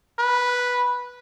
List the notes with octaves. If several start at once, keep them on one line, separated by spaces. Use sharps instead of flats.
B4